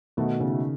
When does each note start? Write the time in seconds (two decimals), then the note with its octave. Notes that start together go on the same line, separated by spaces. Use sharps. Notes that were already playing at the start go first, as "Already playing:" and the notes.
0.17 B2 D#3 A3 D#4 F#4
0.40 C#3